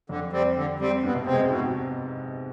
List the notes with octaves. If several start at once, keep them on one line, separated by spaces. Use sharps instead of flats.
F2 D3
G3 C4
D3
G3 C4
G2 B2
B2
C3 G#3 C4
G#2 B2